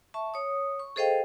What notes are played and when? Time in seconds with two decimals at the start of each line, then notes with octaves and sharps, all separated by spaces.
0.14 E5 A5 C#6
0.34 C#5 D#6
0.79 C#6
0.96 G#4 A4 C5 D#5 F5 G5